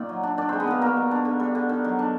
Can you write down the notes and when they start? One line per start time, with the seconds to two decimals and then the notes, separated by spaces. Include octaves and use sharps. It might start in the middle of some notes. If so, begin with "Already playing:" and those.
Already playing: A#2 D#3 D5
0.09 F#3
0.23 D4
0.38 D#3 D4 D5
0.49 G#3 C4 C5
0.60 B3 B4
0.67 D#3 A#3 A#4
0.81 B2 A#3 A#4
0.97 G3
1.11 D4
1.25 D3
1.40 G3
1.55 D3
1.69 D#3
1.84 F#3
1.99 D4